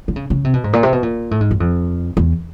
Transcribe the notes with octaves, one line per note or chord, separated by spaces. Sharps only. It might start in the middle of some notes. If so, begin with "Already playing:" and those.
D3
C#3
C#3
C3
B2
G#2
A#2
C3
B2
A#2
A2
G#2
F#2
F2
E2